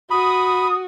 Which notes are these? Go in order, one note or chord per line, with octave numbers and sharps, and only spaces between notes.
F#4 B5 D#6